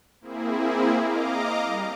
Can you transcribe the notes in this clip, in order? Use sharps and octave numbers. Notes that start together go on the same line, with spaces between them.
A#3 C4 E4 G#4
D#5 F5 A#5 D6
G3